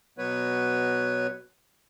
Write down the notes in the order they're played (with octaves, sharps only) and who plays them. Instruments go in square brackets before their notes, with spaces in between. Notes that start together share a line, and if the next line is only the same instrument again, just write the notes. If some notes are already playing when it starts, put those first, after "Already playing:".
[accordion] B2 F#3 B3 B4 C#5